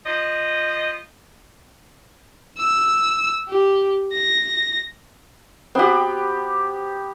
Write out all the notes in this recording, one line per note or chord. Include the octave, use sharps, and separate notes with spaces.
F3 D#5
E6
G4
A#6
B3 C4 F#4 G4